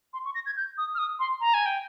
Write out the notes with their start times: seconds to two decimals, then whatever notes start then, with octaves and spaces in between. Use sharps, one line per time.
0.13 C6
0.25 C#6
0.35 A#6
0.46 G#6
0.57 G6
0.78 D#6
0.95 F6
0.98 D#6
1.19 C6
1.41 A#5
1.54 G#5
1.66 G5